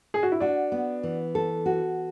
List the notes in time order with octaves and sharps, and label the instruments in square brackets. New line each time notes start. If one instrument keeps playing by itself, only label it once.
[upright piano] G#4
F#4
E4
[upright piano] D4 [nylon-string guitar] F#4
[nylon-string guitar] B3
E3
A4
F#4